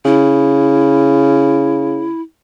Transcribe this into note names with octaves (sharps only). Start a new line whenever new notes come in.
C#3 E4